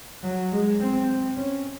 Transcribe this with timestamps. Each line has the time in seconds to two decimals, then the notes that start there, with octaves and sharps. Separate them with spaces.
0.23 F#3
0.52 G#3
0.80 C4
1.37 C#4